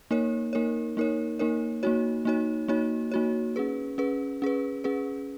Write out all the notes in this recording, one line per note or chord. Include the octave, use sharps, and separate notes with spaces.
A#3 D#4 A#4 C#5
A#3 D#4 A#4 C#5
A#3 D#4 A#4 C#5
A#3 D#4 A#4 C#5
A#3 D#4 F#4 C#5
A#3 D#4 F#4 C#5
A#3 D#4 F#4 C#5
A#3 D#4 F#4 C#5
C#4 G#4 B4
C#4 G#4 B4
C#4 G#4 B4
C#4 G#4 B4